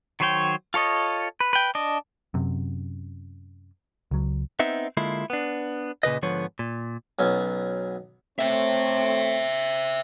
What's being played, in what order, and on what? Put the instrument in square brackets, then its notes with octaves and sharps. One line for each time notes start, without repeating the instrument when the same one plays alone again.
[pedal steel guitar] D#3 F#3 C5 C#5 G5
F4 A4 C#5 D#5
B4
B4 G5
D4 D#5
[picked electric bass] F#2 C3
C#2 F#3
[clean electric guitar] B3 C4 D#4 E5
D3 G#3 A#3 E4 F4
B3 D4
A#2 C#3 B4 D#5
G#2 D3 F3 B3 C#5
A#2
[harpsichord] B1 F#3 B3 C#4
[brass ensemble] A3 C4 C#5 [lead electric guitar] C5 E5